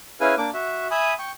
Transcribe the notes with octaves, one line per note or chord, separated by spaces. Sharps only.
C#4 E4 G#4 B4 F5 G#5
A#3 D4 D6
F#4 E5
E5 G#5 B5 D#6
G5 C#6